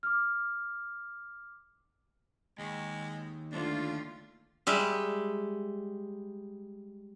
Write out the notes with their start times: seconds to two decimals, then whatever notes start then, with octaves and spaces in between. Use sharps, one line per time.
0.03 D6 F6
2.58 D#2 G#3
3.52 D3 A3 D4 F4
4.67 G3 G#3 E5